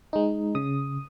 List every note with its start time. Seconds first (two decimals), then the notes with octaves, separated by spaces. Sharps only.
0.13 G#3 D#4
0.55 C#3 D#6